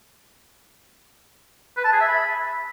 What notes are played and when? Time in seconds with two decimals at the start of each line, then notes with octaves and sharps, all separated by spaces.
1.77 B4
1.84 A5
1.92 G#4
2.00 E5
2.08 B5